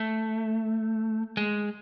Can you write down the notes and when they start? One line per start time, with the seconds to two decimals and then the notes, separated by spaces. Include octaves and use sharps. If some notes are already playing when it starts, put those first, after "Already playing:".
Already playing: A3
1.37 G#3